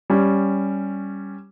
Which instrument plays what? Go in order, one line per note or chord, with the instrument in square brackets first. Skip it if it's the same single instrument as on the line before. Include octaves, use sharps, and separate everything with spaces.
[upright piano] G3 C#4